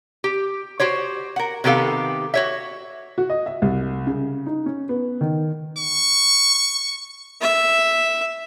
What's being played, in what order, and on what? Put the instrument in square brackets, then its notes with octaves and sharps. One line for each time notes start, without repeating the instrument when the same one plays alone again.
[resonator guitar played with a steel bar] G4
F#4 G4 C5 C#5
A#4 F#5
C3 D#3 B3 G4 A4 F5
F#4 C#5 E5
[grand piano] F#4
D#5
E5
C2
C#3
D#4
C#4
B3
D#3
[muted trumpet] C#6
[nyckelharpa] E5